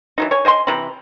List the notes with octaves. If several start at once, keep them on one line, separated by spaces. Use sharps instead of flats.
E3 F#3 D#4
C#5 G#5
C5 D#5 G#5 C6
C3 E3 A#5 B5